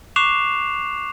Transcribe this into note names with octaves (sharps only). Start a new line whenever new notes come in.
C#6 D6 F#6 C7 E7 F7